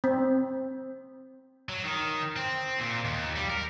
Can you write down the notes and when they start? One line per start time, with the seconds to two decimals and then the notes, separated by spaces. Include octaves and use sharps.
0.04 C4
1.69 F#3
1.85 D#3
2.36 C4
2.79 A#2
3.05 D#2
3.36 G3
3.50 A#4